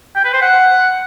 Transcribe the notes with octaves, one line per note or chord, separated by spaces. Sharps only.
G5
B4
C5
F#5